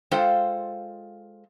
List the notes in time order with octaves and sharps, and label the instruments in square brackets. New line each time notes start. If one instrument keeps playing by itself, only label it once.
[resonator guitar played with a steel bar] G#3 F4 A4 C5 F5 G5